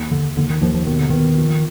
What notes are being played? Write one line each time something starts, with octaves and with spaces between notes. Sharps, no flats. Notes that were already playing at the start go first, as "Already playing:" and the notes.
Already playing: D#2
D#2 D3
D#2 D3
D#3
D#2 F3
F3
B2 D#3
D3
D#3 B3
F3